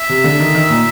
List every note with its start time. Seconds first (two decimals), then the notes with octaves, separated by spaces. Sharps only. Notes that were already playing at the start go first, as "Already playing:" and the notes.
Already playing: E5
0.09 C3
0.24 D3
0.40 D#3
0.55 D#3
0.70 A#2